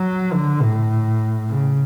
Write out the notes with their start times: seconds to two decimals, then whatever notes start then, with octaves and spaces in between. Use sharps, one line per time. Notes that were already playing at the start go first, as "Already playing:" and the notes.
Already playing: F#3
0.33 D3
0.62 A2
1.49 C#3